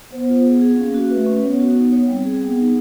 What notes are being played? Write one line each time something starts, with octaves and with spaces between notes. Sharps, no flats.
B3 C5
F4
G#4
G#4
A#3 C#4
F#4
A3 B4
C#4
B3 C#5
F#4
D#4
C#5
G3 C4
G#4
B3 G#4
D#4